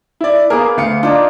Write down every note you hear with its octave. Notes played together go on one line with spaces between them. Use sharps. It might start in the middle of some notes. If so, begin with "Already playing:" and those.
E4 D5
A#3 B3 G#4 A#4
D2 F5 C#7
A#3 D4 D#4 F4